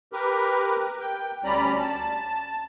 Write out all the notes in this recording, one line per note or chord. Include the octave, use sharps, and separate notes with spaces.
G4 A#4 B4
G5
D2 G3 C#4 D5 A#5 B5
A5